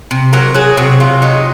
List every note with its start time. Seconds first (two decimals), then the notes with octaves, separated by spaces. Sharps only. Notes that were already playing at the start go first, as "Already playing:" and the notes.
0.11 C3
0.33 F#3 A#4
0.55 F#3 G#4
0.77 C3 F#4
1.00 C3 F4
1.22 F#3 D#4